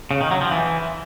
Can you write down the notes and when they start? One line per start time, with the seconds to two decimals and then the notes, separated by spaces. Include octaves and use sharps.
0.11 C#3
0.21 D#3
0.31 F#3
0.41 F3
0.51 E3